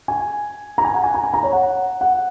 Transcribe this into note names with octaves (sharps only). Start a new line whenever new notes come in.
G#5
A#5
G#5
F#5
G#5
A#5
G#5
A#5
C#5
F#5
F#5